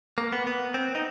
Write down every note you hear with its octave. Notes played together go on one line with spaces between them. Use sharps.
A#3
B3
B3
C4
D#4